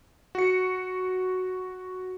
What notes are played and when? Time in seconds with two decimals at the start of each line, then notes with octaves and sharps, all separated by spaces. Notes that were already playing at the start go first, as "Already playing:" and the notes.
0.35 F#4 C#7